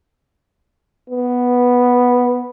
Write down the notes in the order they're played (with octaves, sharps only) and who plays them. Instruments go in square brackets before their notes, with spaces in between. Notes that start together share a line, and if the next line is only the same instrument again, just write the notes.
[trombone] B3